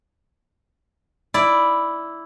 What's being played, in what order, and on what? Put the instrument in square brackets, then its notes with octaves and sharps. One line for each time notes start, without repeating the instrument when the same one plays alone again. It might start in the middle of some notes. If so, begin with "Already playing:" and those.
[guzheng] E4 D5